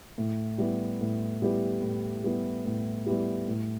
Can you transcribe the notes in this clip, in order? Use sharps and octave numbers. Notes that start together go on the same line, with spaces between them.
A2
G3 B3 E4 G4
A2
G3 B3 E4 G4
A2
G3 B3 E4 G4
A2
G3 B3 E4 G4
A2